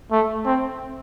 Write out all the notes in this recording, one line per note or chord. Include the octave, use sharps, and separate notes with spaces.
A3
C4